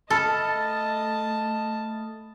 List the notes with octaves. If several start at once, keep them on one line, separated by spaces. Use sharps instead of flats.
A3 A4 D#5 A5 B5 F6 A6